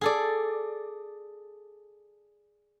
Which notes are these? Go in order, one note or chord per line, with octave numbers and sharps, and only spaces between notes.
G#4 A4 D5